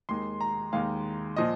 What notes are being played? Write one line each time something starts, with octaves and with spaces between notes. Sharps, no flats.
D#2 D#3 G#3 C6
A#5
D#2 D#3 G#3 F5
A#2 F3 D#5